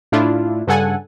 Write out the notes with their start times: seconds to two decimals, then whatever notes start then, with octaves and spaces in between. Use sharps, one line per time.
0.12 A2 A3 D4 E4 F4
0.67 G2 C#3 A4 F#5 G#5